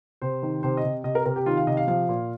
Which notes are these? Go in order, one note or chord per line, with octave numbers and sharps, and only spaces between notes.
C3 C5
D#3
C3 C5
D#5
C3
C3 D#5
A#4
C3 A#4
G4
D#3 F4
F5
C3 D#5
F5
F3 F5
A#2